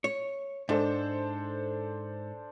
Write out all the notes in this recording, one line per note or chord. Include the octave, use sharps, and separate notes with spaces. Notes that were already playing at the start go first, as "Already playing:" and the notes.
C#5
G#2 D4 A4 C5